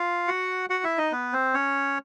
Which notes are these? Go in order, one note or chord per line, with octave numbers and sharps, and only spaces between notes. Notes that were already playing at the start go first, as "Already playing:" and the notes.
Already playing: F4 F5
F#4 F#5
F#4 F#5
E4 E5
D#4 D#5
B3 B4
C4 C5
C#4 C#5